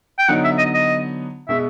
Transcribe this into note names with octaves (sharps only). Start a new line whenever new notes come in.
G5
D3 F#3 B3 D#4 F#5
E5
D#5
D#5
B2 G#3 B3 E5